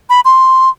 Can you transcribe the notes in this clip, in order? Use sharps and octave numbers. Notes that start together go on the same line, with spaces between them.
B5
C6